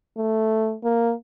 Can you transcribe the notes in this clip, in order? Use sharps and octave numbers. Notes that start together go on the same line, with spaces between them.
A3
A#3